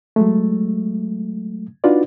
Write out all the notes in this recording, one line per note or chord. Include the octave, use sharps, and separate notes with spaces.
F#3 G#3 A3
D4 D#4 F4 F#4 B4 D5